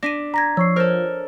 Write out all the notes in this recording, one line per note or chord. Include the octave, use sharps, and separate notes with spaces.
D4 A#6 B6 D#7
A#5 G#6 A#6 B6
F3 C#5 C#6 E6 C7
A4 A#4 C5 C#5 F6